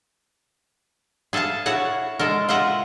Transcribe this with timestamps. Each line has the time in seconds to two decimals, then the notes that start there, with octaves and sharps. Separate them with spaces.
1.33 G#4 A4 E5 F5 A5
1.66 E4 F#4 C#5 F#5 A5
2.19 G#3 A4 A#4
2.49 F4 D#5 E5 F#5